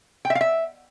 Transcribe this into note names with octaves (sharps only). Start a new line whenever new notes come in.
G5
E5
F5
E5